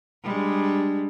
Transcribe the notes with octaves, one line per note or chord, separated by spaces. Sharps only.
G3 G#3 D4